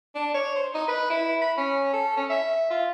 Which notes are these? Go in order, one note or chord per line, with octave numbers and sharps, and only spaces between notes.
D4
C#5
C5
D#4
B4
E4
B5
C#4
A4
C#4
E5
F4